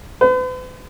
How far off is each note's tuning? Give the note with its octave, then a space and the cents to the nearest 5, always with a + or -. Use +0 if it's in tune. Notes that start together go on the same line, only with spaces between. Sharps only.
B4 +45